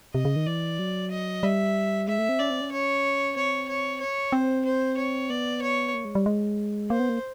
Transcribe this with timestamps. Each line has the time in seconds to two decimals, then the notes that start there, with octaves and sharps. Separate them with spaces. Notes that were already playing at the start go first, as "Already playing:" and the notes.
0.14 C3 D#5
0.25 C#3
0.36 D#3
0.47 E3 D5
0.79 F#3
1.11 D#5
1.43 G3 E5
2.08 G#3 E5
2.19 A3
2.29 C4
2.39 C#4 D5
2.50 C4
2.61 C#4
2.72 C#5
3.36 C4 C#5
3.69 C#5
4.01 C#5
4.32 C4 C5
4.65 C5
4.97 C#5
5.30 B3 D5
5.62 C#5
5.94 A#3
6.05 G#3
6.15 G3
6.26 G#3
6.90 A#3 C5
7.00 B3
7.09 A#3